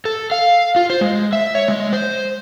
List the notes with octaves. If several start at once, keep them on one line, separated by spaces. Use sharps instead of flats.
A4
F5
F4
C5
G#3
E5
C#5
G#3
C5